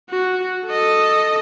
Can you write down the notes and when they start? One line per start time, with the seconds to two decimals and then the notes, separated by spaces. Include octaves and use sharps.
0.10 F#4
0.67 A4 D#5